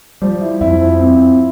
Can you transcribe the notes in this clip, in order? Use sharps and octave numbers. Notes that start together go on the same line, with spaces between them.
F3 G3
E4
F2 E4
F3
C4